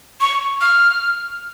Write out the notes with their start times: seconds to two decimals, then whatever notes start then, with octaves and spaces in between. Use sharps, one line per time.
0.21 C#6
0.61 F6